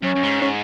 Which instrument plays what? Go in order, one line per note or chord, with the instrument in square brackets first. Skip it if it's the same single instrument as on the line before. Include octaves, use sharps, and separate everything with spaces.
[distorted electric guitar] F#2 [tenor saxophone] C#4
[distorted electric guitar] F#2
G#2
[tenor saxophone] C#4